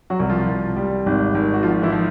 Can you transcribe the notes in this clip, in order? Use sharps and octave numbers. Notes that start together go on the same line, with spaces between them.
F#3 F#4
C2
F3 F4
C2
G3
G#1
G#1
F#4
F3 F4
E3 E4
F3